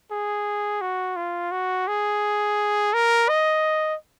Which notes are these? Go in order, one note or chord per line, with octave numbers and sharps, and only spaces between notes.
G#4
F#4
F4
F#4
G#4
A#4
D#5